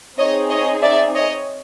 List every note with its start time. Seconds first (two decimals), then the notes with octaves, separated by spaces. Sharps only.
0.18 C4 D#4 G#4 C#5 D#5
0.50 C#5 D#5
0.83 D5 E5
1.15 C#5 D#5